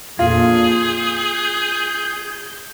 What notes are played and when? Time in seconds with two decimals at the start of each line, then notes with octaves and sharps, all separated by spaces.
0.19 F2 A#2 D3 F4 G#4
0.61 G6